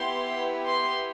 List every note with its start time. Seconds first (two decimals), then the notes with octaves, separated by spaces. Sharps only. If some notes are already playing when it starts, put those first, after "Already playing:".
Already playing: B3 E4 G4 C6
0.67 C6